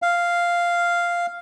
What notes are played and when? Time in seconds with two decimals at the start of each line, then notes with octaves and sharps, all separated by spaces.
0.02 F5